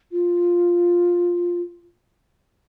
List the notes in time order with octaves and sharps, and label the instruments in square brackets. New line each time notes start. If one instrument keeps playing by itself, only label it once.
[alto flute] F4